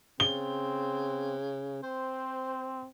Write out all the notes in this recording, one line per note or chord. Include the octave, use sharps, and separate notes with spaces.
C#3 C4 G7
C4 C5